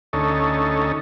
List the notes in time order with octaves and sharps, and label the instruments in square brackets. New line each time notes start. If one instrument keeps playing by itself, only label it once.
[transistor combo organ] D2 C#4 D#4 A4